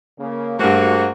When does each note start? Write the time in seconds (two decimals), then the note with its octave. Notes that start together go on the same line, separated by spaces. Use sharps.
0.19 C#3 A#3
0.59 G2 A3 A#3 F#4 G#4 C5 F#5